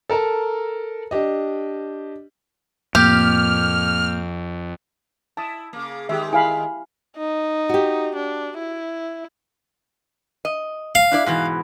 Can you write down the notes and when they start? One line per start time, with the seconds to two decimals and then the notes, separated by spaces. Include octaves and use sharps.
0.10 A4 A#4 A5 A#5
1.11 D4 G4 D#5
2.95 F2 A2 A#3 G4 F6 G6
5.37 E4 A5 D#6
5.73 C#3 A#3
6.09 D#3 G#3 G4 E5
6.33 E4 F5 G#5 B5
7.18 D#4
7.69 F#4 G4
8.15 D4
8.59 E4
10.45 D#5
10.95 F5
11.12 D4 E4 D5
11.26 G#2 B2 E3